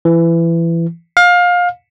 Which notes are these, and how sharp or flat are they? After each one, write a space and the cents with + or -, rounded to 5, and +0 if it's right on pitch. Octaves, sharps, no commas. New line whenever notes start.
E3 +20
F5 +25